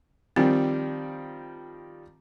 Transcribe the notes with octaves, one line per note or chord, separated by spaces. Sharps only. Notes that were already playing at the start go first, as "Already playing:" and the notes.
D#3 F3 G3 C4